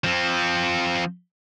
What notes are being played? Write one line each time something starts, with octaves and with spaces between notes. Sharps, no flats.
F3 C4